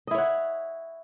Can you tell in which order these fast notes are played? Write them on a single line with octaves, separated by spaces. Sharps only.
D#5 E4 C#5 F#5